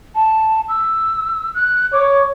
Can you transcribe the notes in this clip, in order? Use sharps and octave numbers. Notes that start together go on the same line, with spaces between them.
A5
E6
F#6
C#5 D6